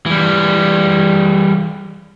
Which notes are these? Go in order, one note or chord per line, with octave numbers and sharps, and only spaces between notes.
E3 G3